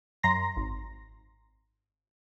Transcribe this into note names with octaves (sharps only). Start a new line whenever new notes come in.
F#2 A#5 C6 A#6
G#1